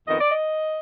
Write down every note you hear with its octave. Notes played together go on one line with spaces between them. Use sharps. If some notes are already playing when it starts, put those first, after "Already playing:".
F2 D#3 B3 D#5
D5
D#5